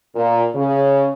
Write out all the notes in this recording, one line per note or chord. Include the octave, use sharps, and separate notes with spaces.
A#2
C#3